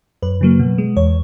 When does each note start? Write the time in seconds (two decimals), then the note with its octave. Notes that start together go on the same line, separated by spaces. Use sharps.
0.22 F#2 B4
0.41 C#3 F#3 A#3
0.60 B2
0.78 G#3
0.96 E2 C#5